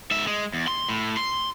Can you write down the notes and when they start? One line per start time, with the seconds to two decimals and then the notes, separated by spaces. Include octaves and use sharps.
0.11 G#2 E5
0.27 G#3
0.54 E2
0.68 C6
0.89 A2
1.17 C6